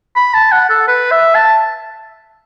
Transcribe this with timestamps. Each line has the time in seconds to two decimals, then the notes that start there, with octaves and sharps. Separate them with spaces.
0.16 B5
0.34 A5
0.51 F#5
0.70 A4
0.88 B4
1.11 E5
1.35 A5